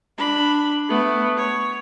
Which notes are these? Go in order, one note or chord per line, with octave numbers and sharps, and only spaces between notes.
D4 B5
A3 B3
C#5